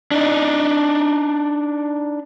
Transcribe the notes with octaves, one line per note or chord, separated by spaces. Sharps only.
D4 D#4